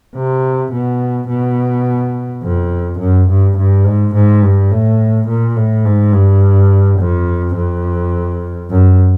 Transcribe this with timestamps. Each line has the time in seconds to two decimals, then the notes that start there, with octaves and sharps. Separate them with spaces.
0.15 C3
0.72 B2
1.29 B2
2.44 F2
2.99 F#2
3.29 G2
3.58 G2
3.86 G#2
4.15 G#2
4.43 G2
4.71 A2
5.29 A#2
5.56 A2
5.85 G#2
6.13 G2
6.99 F2
7.56 F2
8.70 F#2